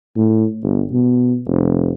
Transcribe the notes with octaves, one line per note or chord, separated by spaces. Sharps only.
A2
G1
B2
F1